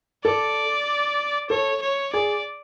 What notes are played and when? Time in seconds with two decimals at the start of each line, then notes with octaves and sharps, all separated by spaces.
0.25 A4 D5
1.50 A4 C#5
1.82 C#5
2.13 G#4 D5